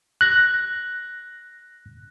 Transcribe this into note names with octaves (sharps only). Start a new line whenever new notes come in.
F#6 A#6